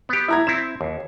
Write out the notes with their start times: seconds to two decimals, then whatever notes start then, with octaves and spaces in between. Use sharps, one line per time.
0.09 B3 G4
0.28 E4 A#5 G#6
0.47 C4 E4 E7
0.81 D#2